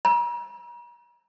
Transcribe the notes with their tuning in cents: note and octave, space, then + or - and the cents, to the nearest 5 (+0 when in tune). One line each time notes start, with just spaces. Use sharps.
A#5 +45